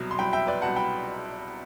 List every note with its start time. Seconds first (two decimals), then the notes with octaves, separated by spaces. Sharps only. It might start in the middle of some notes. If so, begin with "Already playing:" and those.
Already playing: C2 B2 F#3
0.11 C6
0.19 C2 B2 F#3 G5 B5
0.33 E5 G5
0.47 B4 D5
0.62 C2 B2 F#3 F#5 A5
0.76 G5 B5